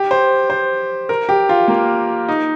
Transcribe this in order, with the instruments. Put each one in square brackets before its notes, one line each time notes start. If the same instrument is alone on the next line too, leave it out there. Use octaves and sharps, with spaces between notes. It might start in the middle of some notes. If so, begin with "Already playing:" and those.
Already playing: [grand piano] G4
C5
C5
A#4
G4
F4
A#3
D#4